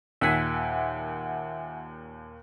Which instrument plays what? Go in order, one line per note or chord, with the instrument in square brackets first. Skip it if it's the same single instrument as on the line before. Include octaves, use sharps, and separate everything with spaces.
[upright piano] D#2 A#2 B6 [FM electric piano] E5 F#5 G#5